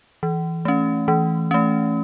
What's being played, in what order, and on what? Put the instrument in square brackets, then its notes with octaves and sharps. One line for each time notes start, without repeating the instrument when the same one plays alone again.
[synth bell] E3
A3 C#4
E3
A3 C#4